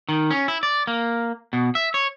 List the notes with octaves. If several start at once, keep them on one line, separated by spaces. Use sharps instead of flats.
D#3
C#4
E4
D5
A#3
B2
E5
C#5